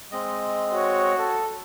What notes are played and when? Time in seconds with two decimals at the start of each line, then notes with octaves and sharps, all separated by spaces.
0.12 G#3 C4 D#5
0.72 F#4 C#5
1.18 A4